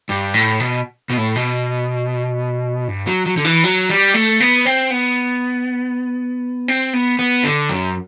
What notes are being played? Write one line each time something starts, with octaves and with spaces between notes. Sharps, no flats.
G2
A2
B2
B2
A2
B2
G2
F#3
F#3
D3
E3
F#3
G3
A3
B3
C4
B3
C4
B3
B3
D3
F#2